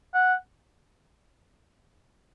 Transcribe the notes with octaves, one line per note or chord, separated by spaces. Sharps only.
F#5